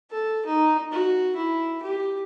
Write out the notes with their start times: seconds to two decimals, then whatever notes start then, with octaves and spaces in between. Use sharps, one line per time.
0.11 A4
0.46 D#4
0.92 F#4
1.36 E4
1.83 G4